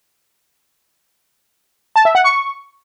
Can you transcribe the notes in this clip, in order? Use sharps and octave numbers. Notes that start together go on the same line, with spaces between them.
A5
E5
F#5
C#6